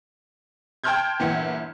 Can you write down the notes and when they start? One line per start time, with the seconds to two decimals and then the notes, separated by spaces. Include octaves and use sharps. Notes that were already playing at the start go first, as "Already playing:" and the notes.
0.84 G5 A5 C6 F6 G6 G#6
1.19 G1 A#2 E3 E4 F#5 C#7